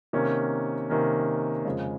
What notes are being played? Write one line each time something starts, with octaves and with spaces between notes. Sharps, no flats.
C3 D#3 A#3 C#4
C3 D#3 A#3 C#4
F2 C#3 G#3